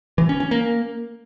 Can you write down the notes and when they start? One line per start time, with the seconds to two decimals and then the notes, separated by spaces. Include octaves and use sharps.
0.18 E3
0.29 C#4
0.40 C#4
0.51 A#3